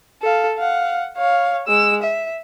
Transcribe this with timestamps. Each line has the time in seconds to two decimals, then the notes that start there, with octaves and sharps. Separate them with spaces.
0.22 A4 F5
0.58 F5 F#5
1.17 C#5 F5
1.67 G#3 E6
2.02 E5